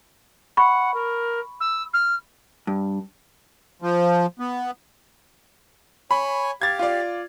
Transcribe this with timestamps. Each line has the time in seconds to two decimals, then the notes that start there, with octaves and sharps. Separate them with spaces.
0.57 F#5 B5 C#6
0.94 A#4
1.60 E6
1.94 F6
2.67 G2
3.82 F3
4.39 B3
6.11 C#5 G#5 B5
6.62 G4 F5 G#6 A6
6.79 F4 D5